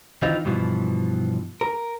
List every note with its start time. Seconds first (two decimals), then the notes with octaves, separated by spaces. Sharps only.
0.22 D#3 E3 C4 D#4 F4
0.45 G2 B2 E3 F3
1.61 A#4